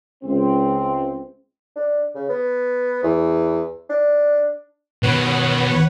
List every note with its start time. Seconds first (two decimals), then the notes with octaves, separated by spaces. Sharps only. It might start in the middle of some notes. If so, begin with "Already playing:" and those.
0.23 C#2 C4
1.76 D4
2.15 C#3
2.29 B3
3.03 E2
3.90 D4
5.03 B2 D#3 B4 C#5 F#5